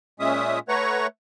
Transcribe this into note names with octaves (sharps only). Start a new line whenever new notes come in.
A#2 G#3 C#4 E5 D#6
A3 B4 C#5 F#5 A#5 C#6